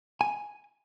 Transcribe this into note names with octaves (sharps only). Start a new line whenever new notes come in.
G#5